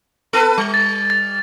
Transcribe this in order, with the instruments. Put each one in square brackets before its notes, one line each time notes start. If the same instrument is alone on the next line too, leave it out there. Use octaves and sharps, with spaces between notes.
[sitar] B3 A4 B4
G3
[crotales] A6
A6